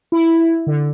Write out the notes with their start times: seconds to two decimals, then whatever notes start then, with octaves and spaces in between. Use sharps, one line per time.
0.12 E4
0.67 D3